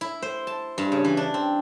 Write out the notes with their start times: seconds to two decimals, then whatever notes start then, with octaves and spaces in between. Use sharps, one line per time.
0.01 E4
0.22 C5
0.47 A5
0.78 G2
0.92 C#3
1.04 E3
1.17 D4
1.34 C4